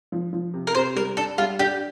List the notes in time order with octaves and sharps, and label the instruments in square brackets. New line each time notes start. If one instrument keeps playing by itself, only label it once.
[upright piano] F3
F3
C3
[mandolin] A#4
[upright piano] C3 [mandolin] C5
[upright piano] G3 [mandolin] A#4
[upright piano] D4 [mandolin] A4
[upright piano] G3 [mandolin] F4
[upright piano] D4 [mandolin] G4